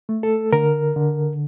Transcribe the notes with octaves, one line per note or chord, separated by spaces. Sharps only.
A3
A4
D3 A#4
D3